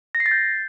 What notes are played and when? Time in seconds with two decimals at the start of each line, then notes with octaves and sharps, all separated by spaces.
0.15 A#6
0.20 C7
0.26 A6
0.31 G6